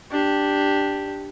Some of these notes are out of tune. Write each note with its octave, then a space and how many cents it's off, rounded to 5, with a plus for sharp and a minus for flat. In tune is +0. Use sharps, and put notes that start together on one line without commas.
D4 +0 G4 +0